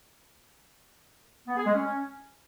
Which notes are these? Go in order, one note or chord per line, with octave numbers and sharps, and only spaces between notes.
B3
G#4
G#3
C#4